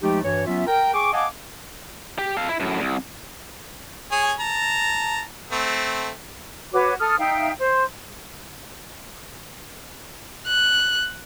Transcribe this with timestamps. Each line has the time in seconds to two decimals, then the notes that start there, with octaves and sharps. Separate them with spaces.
0.02 F3 G#3 A3 D#4 G4
0.24 G2 E3 F#4 C#5
0.47 F#3 B3 C#4 F4 E5
0.67 A#4 G5
0.94 G#4 G5 C#6 D6
1.13 D#5 F5 F#5 G#5 A5 D6
2.18 G4
2.37 A4 F5
2.48 E4
2.60 F#2 A2
2.80 C2
4.12 G#4 C#5 G#5
4.40 A5 A#5
5.51 A3 C4
6.73 F#4 B4 C#5 D6
6.99 A4 D#6 F6
7.19 D#4 E5 F5 G5
7.59 C5
10.47 F#6